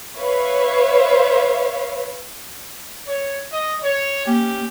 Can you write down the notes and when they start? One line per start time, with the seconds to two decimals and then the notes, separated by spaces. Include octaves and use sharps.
0.17 B4 C#5 E5 F5
3.08 C#5
3.53 D#5
3.84 C#5
4.27 A#3 C#4 G4